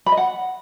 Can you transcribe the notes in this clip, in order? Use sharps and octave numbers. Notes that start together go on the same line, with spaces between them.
B5
D#5
F#5